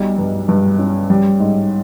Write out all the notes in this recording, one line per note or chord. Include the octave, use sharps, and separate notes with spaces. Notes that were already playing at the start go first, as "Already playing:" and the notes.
Already playing: B1 G3
G2
G2
C#4
G3
G#2